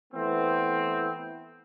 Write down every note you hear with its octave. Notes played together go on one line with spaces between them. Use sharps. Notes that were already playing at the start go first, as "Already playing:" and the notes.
E3 A3 B3 C4